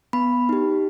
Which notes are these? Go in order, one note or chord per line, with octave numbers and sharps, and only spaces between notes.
B3 B5
D#4 G4